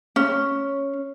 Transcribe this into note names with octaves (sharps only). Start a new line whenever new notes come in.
C#4